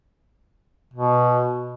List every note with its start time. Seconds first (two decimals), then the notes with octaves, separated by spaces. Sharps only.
0.93 B2